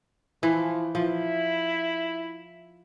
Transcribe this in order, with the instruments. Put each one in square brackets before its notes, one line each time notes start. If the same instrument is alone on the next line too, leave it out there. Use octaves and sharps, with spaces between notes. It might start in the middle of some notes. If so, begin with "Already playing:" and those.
[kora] E3 [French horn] F3
[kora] F3 [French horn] E4